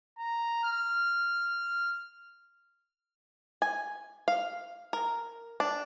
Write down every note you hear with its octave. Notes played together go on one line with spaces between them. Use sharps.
A#5
F6
G#5
F5
A#4
D4